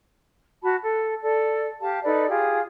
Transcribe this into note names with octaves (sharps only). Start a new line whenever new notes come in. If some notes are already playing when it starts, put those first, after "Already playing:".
F#4 A5 B5
A4
A4 D5
G4 F5 A5
D#4 A4 B4 D5
F4 G4 G#4